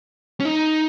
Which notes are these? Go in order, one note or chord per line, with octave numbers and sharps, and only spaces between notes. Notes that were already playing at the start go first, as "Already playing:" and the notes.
C#4
D#4